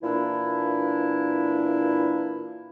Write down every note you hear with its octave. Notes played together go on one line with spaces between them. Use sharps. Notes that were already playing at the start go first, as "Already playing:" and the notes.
A#2 E3 D4 E4